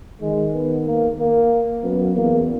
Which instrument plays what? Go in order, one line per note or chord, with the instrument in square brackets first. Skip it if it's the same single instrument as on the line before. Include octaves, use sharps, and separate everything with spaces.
[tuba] D#3 [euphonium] G#3
[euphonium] B3
A#3
A#3
[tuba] F#2 [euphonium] B3
[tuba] E2 [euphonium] A#3